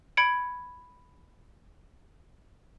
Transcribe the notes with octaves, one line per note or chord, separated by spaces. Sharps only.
B5 G#6 C#7 D7